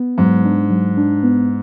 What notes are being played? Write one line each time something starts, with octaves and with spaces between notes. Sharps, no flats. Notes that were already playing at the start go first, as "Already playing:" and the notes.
Already playing: B3
G#2 F#3
D4
F#3
D4
B3